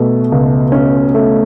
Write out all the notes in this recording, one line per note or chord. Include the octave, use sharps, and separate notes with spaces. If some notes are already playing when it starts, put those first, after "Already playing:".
Already playing: B2 A3
C#2
C#4
A3